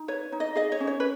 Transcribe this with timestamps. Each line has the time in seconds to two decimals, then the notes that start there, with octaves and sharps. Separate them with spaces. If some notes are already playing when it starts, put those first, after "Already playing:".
Already playing: D#4
0.08 B4 C#5
0.32 D#4
0.40 D#5
0.55 G#4 D#5
0.72 C#5
0.80 C#4
0.87 C#5
1.00 B4